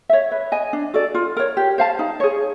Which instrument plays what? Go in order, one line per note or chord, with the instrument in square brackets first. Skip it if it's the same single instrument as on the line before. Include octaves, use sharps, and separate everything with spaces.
[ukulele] C#5 E5
B4
D#5 G#5
D4
F#4 A4 D5
F4
A#4 C#5
G4
C5 F5 A5
D#4
G#4 C#5